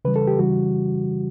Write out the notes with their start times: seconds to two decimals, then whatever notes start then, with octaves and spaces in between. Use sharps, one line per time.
0.05 C#3 E3 G3 B4
0.16 A4
0.27 G4
0.39 C#3 E3 G3 F#4